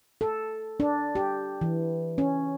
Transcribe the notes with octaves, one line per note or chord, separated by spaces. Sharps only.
A4
D4
G4
E3
C#4